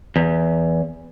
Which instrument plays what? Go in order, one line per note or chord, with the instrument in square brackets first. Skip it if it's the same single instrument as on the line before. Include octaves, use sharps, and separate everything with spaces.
[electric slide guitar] E2